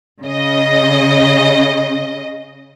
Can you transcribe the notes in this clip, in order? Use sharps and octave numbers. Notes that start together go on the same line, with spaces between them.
C#3 D#5